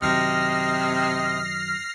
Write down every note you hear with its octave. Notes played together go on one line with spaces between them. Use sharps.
F#2 C3 D#3 F#3 D#5 F6 A#6 C7